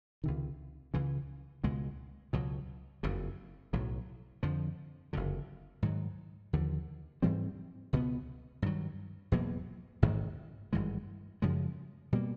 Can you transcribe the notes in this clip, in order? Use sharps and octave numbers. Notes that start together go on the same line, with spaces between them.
C#2 C3 D#3
C#2 C#3 E3
C#2 B2 G#3
C#2 B2 F#3
F#1 F2 C#3
B1 A2 F#3
F2 D3 F3
F#1 F2 D3
G#2 D#3 F#3
D#2 D3 F3
G#2 E3 G3 C4
C#2 B2 G3 B3
G2 D#3 F#3
E2 B2 F#3 A#3
A1 G#2 D#3
G#1 G2 E3 G#3
F#2 C#3 F3 G#3
B2 G3 A#3